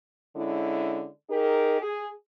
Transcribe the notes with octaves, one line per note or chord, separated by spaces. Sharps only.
D3 G#3 C#4 E4
D#4 G4 G#4 A#4
G#4